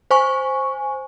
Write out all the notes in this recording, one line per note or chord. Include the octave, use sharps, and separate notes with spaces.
C5 G#5 C#6